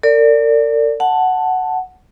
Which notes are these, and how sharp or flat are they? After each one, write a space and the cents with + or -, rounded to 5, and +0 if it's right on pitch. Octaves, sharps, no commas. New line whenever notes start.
A#4 -45 D5 -10
F#5 +0 A5 +0